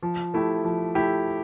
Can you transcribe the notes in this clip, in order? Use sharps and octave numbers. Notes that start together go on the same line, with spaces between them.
F3
A3 E4 G4
F3
A3 E4 G4